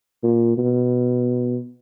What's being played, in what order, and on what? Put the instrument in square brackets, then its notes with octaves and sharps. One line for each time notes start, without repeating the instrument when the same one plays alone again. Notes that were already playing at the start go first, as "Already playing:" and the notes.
[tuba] A#2
B2